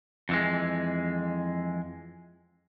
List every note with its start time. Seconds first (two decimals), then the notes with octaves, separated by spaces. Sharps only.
0.29 F2 E3 G#3